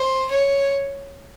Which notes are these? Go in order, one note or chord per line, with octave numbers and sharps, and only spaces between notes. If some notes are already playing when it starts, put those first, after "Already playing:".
Already playing: C5
C#5